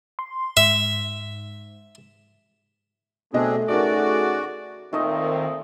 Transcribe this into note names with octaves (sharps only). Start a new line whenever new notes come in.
C6
G#2 E5
B2 A3 C4 D4 G#4 D#5
C#3 D#4 F#4 G#4 A#4 D5
A#2 D#3 A3 C4 D#5